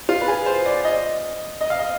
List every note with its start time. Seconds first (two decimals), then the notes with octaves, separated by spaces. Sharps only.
0.09 F4
0.21 B4
0.28 G#4
0.46 C5
0.66 D5
0.85 D#5
1.61 D#5
1.70 F5
1.79 D#5